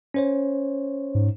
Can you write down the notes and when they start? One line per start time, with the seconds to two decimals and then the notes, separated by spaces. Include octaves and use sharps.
0.14 C#4 C5 C#5
1.15 G#2